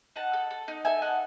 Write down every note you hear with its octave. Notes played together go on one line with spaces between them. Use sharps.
D#4 F#5 A5
A4
A4
D#4
A4 E5 G#5
D#4 F#5 A5